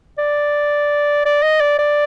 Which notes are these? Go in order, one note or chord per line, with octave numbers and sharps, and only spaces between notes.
D5
D5
D#5
D5
D5